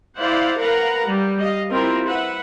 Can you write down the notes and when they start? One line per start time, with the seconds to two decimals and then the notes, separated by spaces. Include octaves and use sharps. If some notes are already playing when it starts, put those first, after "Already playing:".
0.19 E4 C5 D5 F5 F#5
0.59 A#4 B4 F5 F#5 A#5
1.07 G3
1.40 D#5 F5
1.72 C4 E4 F4 G4 A#4
2.08 B4 E5 F#5